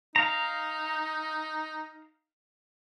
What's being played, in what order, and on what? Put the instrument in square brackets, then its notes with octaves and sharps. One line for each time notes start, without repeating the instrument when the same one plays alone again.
[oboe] D#4 [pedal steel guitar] F5 A#5